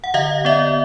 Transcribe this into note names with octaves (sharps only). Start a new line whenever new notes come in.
F#5
D3 D#5 F5
B3 D5 E5